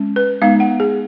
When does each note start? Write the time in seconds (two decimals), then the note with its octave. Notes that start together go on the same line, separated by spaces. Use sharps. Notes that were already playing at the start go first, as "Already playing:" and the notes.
Already playing: G#3 C#4
0.16 B4
0.42 G#3 B3 D#4 F5
0.60 F#5
0.80 G#4